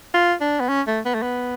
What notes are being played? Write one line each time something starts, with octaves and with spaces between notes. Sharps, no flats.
F4
D4
B3
C#4
A3
B3
A3
B3